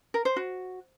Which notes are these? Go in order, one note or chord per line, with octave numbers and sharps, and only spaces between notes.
A#4
C5
F#4